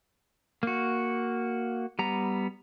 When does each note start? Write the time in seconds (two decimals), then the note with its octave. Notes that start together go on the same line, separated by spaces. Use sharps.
0.63 A#3 F#4
1.99 G3 B3 A#5